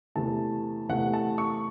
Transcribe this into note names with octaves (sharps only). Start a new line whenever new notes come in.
E2 C3 E3 A3 A5
E2 C3 E3 A3 F#5
A5
C#6